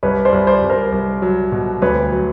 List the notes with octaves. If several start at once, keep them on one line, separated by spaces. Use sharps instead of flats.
C2 B4 C#5
C5 D5
C2
C5 D5
C2
A#4 C5
C2
F#3
B2
D2 B4 C#5
F#3